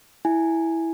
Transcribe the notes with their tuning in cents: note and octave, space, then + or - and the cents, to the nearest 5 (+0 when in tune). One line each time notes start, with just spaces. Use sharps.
E4 -5 G#5 +0